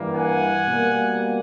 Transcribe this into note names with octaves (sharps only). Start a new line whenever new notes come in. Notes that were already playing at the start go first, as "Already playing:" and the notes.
Already playing: G2 E3 G3 A#3
F#5 G#5
B2 G3 A#3